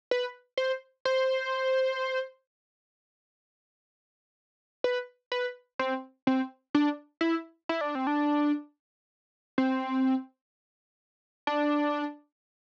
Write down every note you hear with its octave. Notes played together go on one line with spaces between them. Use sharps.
B4
C5
C5
B4
B4
C4
C4
D4
E4
E4
D4
C4
D4
C4
D4